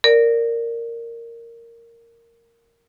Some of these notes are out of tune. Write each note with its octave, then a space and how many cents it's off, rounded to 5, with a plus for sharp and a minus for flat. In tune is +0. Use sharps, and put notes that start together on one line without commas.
A#4 -10 D5 -5